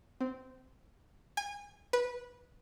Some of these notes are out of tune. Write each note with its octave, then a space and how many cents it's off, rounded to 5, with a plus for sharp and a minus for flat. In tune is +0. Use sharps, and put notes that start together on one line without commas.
C4 -15
G#5 -30
B4 -15